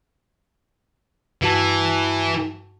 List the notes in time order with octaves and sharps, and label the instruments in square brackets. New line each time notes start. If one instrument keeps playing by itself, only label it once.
[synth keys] G2 F#4 A5 [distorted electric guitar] E3